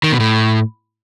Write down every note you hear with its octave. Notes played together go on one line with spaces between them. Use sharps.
D#3
B2
A2